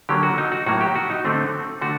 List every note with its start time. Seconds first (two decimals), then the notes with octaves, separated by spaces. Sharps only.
0.09 D3 F#3 A#3 G4
0.23 F#4
0.38 D#4
0.52 F#4
0.66 A2 F#3 A#3 F#4
0.81 G4
0.95 F#4
1.10 D#4
1.25 D3 A3 C4
1.81 D3 A3 F#4